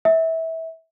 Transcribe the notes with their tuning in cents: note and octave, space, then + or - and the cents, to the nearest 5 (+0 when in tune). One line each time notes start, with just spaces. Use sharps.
E5 -25